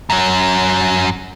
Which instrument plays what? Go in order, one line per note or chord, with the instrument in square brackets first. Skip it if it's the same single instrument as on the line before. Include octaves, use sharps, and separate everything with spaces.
[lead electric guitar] F#2 F#3